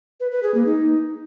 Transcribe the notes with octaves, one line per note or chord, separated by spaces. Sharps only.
B4
B4
G#4
A#3
D#4